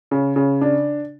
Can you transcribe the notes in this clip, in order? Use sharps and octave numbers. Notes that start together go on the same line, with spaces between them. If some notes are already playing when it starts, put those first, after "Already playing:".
C#3
C#3
D4